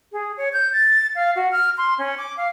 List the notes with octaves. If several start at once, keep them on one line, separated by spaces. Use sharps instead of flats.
G#4
C#5
G6
A6
F5
F#4
F6
C6
C#4
D6
F5